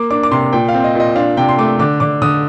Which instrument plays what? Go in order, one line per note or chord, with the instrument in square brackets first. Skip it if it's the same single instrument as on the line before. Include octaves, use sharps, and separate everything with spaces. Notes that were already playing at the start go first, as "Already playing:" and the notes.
Already playing: [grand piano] A#3 D6
D4 D6
D6
C3 C6
A#2 G5
F5
C4
D#5
A#2 D#5
D4 F5
C3 G5
C6
A3 D6
D3 D6
D3 D6
D3 D#6